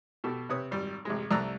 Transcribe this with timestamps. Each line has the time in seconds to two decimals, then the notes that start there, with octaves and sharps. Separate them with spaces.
0.24 B2 G4 A4
0.49 C3 B4 C#5 D#6
0.71 G#1 G3
1.05 A1 C3 G#3
1.31 C2 A3 D5 A#5 E6 F#6